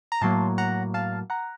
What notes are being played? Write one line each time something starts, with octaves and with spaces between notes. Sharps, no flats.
A#5
A2 F#3 A#3 A5 C6
F#5 A#5
F5 A5
F#5 A#5